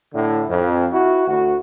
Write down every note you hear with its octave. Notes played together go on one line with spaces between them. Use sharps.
A2 D3
F2
E4 F#4
D2 F#4